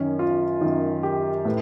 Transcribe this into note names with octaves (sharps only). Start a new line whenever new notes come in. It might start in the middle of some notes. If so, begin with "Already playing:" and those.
Already playing: F#2 D#3 C#4
F4
F#2 D#3
G4
A2 B4